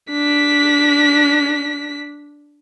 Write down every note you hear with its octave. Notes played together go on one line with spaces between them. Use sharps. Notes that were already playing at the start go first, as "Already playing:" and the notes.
D4 B6